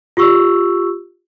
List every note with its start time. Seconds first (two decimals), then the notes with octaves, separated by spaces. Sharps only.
0.17 F4 G4 C#6 E6